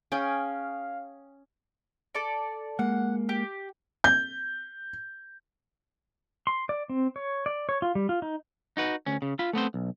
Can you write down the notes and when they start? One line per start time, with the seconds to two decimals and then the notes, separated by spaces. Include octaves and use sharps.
0.12 C#4 G#4 F5 G5
2.15 A4 D5
2.79 G#3 A#3 F#5
3.29 G4
4.04 G6
6.47 C6
6.69 D5
6.89 C4
7.16 C#5
7.46 D5
7.69 C#5
7.82 F4
7.95 G3
8.09 F4
8.22 D#4
8.77 D#4 F#4 B4
9.06 D2 C#4
9.22 C#3
9.39 F4 B5
9.53 A3 B3 C4 C5
9.74 B1